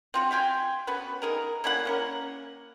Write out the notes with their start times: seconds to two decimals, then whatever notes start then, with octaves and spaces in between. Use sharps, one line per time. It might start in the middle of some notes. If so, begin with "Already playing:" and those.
0.14 C4 F4 F#4
0.31 E5 F5 G5 G#5
0.87 B3 C#4 F#4 B4
1.22 D#4 G#4 A#4
1.64 A#3 C#4 E4 F#5
1.85 A#3 C#4 A#4